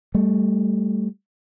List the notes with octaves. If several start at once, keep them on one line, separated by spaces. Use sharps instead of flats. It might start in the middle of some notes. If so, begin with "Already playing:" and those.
G3 A3